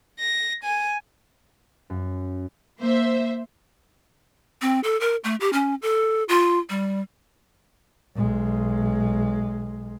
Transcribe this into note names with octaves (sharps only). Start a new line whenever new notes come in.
A#6
G#5
F#2
A#3 C5 E5
C4
A4
A#4
A3
G4
C#4
A4
F4
G3
B1 G#3